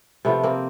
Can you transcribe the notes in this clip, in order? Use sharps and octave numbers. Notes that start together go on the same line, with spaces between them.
C3 F3 A3 B3
A#3 C4